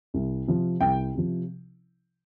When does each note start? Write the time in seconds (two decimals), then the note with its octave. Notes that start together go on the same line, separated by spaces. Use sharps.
0.14 C2
0.47 C3 F3
0.81 C2 G5
1.14 C3 F3